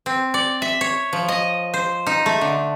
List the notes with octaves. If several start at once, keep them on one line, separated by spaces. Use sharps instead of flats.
C4
D5
E5
C#5
F3
D#5
C5
D#4
A3
D3